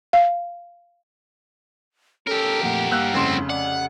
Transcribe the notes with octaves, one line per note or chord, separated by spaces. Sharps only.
F5
C#4 G4 A4 A#4
F2 A#2 A3 F#5
G2 A#3 F5 E6 F#6
F1 C#3 C4 E4 C6
D5 F#5